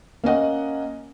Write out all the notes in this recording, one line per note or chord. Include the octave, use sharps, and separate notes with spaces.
A#3 C#4 D#5 F#5